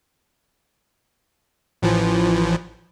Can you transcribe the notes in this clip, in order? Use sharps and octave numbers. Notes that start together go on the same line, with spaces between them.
A1 E3 F3